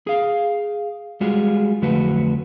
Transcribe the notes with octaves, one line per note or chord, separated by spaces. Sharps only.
G#4 F5
G3 G#3 F4 F#4 G#4
F2 D3 F#3 A3 F#4 B4